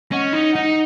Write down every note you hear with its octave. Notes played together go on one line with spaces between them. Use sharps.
C#4 D#5 F#5
D#4
D#4 D#5 F#5